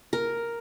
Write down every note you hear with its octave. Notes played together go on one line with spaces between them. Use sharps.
A#4